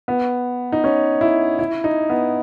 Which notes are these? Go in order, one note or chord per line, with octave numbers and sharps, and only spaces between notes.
B3
D#4
C#4
E4
E4
D#4
B3